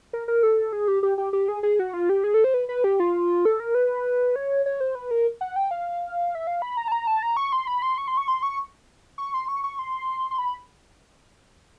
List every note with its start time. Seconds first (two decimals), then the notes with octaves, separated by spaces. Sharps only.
0.13 A#4
0.28 A#4
0.43 A4
0.73 G#4
0.88 G4
1.03 G4
1.18 G4
1.33 G4
1.48 G#4
1.63 G#4
1.79 F#4
1.93 F4
2.09 G4
2.24 G#4
2.34 A4
2.44 C5
2.54 B4
2.69 B4
2.84 G4
3.00 F4
3.45 A4
3.60 A#4
3.75 B4
4.36 C#5
4.66 C#5
4.80 C5
4.95 B4
5.11 A#4
5.41 F#5
5.56 G5
5.71 F5
6.35 E5
6.47 F5
6.62 B5
6.77 A#5
6.88 A5
6.92 A#5
7.07 A5
7.22 A#5
7.37 C#6
7.53 C6
7.67 B5
7.82 C6
7.98 C#6
8.08 C6
8.17 C#6
8.28 C6
8.43 C#6
9.18 C#6
9.34 C6
9.48 C#6
9.64 C#6
9.79 C6
10.31 C6
10.38 B5